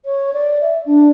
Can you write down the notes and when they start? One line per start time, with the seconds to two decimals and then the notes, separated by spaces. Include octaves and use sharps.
0.05 C#5
0.34 D5
0.61 E5
0.86 D4